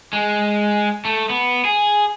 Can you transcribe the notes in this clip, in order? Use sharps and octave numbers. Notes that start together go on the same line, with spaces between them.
G#3
A3
B3
G#4